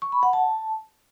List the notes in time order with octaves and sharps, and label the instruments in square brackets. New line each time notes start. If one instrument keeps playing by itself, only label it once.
[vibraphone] C#6
B5
F#5
A5